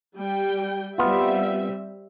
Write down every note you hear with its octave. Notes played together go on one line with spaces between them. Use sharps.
G3 G5
G3 B3 C4 F4 E5